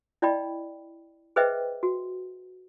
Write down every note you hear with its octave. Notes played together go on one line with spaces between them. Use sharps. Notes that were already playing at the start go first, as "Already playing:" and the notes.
E4 D5 D#5 G5 B5
G#4 B4 C5 D#5 E5 G5
F#4